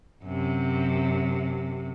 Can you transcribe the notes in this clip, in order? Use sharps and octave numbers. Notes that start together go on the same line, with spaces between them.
F#2 C3